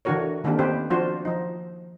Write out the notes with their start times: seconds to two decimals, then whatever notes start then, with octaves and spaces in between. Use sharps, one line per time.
0.05 D3 E3 D4 F#4 A#4 C#5
0.44 D3 D#3 A#3 C4 D4 G4
0.59 D#3 B3 C4 G4 B4 C5
0.90 F3 D4 F4 F#4 C5
1.25 F3 D#4